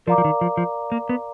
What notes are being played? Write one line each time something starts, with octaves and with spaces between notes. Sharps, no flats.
F3 A#4 D5 F5 A#5 D6
F3
D#3
F3
F3
A#3
B3